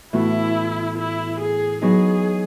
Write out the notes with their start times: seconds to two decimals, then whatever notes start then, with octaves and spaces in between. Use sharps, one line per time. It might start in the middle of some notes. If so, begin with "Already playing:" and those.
0.13 A2 E3 B3 E4 F#4
0.97 E4
1.39 G#4
1.82 F#3 B3 D#4 G#4